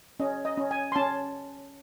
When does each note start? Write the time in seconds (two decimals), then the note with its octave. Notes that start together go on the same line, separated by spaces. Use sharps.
0.20 C#4 D#5
0.45 D#5
0.57 C#4
0.71 G#5
0.92 C6
0.96 C#4 A5